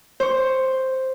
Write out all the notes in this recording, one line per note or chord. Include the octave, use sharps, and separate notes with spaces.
C5 C#6